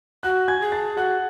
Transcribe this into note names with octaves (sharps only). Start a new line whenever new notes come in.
F#4 F#5 F#6
G#5 G#6
G#4
A5 A6
F#4 F#5 F#6